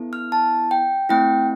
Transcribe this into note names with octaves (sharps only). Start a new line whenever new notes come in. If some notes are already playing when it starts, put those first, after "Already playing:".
Already playing: B3 E4 A4
F6
A5
G5
A3 C4 E4 G5